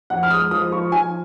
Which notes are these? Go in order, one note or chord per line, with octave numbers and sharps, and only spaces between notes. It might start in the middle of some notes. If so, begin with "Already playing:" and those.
F2 F#5
F6
G#3 D#6
F3 D#6
F3 C#6
F3 G#5